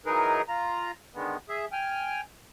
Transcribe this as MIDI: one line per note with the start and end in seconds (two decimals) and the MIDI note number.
0.06 0.42 52
0.06 0.42 54
0.06 0.42 63
0.06 0.42 68
0.06 0.42 70
0.06 0.42 71
0.48 0.92 65
0.48 0.92 82
1.14 1.37 50
1.14 1.37 51
1.14 1.37 56
1.14 1.37 59
1.49 1.65 68
1.49 1.65 76
1.72 2.21 79
1.72 2.21 80
1.72 2.21 89